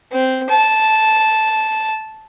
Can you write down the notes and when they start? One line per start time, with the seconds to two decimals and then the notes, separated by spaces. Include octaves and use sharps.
0.12 C4
0.50 A5